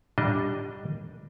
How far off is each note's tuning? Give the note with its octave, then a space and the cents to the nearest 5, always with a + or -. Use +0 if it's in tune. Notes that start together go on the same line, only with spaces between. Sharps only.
G3 +0 D4 +0 D#5 +0